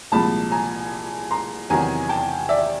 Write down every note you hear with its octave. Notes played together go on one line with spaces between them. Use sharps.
C2 A#2 F3 G#3 A5 B5
G#5 A#5
A#5 C6
E2 C3 D#3 F#3 G#5 A#5
G5 A5
D5 E5